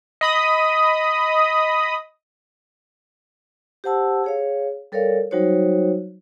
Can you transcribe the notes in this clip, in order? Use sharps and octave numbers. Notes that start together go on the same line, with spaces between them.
D#5 B5 D#6
G4 C5 F#5 A5 E6
G#4 C#5 F5
G3 A4 A#4 C#5 D5 F5
F#3 G3 D#4 F#4 C5 C#5